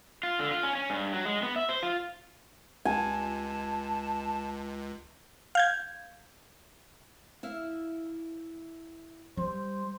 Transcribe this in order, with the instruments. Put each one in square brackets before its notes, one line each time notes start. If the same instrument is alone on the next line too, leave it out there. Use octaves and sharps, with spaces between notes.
[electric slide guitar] F4
D3
F4
C#4
C#4
G2
F#3
G#3
B3
E5
C5
F4
[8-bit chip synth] C#2 [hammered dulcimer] G#5 [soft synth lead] A5
[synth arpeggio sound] F5 G6 G#6
[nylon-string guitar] E4 E5 F5
[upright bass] G3 [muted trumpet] C5